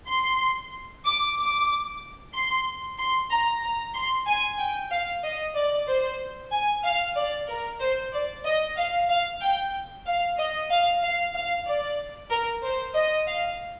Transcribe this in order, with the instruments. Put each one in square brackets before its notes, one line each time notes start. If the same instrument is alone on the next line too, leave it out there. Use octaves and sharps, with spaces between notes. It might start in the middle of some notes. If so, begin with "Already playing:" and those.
[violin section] C6
D6
D6
C6
C6
A#5
A#5
C6
G#5
G5
F5
D#5
D5
C5
G#5
F5
D5
A#4
C5
D5
D#5
F5
F5
G5
F5
D#5
F5
F5
F5
D5
A#4
C5
D#5
F5